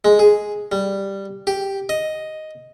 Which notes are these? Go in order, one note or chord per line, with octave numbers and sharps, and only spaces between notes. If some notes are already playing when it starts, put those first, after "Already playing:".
G#3
G#4
G3
G4
D#5